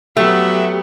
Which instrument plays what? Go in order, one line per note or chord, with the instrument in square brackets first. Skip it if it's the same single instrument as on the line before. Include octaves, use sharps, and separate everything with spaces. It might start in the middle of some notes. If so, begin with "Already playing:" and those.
[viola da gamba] F#3 B3 [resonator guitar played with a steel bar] A3 [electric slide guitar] G4 [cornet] E5